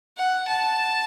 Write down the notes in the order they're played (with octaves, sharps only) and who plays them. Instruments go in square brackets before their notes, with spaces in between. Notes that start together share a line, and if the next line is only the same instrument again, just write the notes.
[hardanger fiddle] F#5
A5